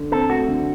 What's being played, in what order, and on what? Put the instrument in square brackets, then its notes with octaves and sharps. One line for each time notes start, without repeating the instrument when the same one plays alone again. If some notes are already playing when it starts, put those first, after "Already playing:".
Already playing: [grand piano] D3
[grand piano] C4 [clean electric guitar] A4
[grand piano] A3 [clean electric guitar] F#4
[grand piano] D3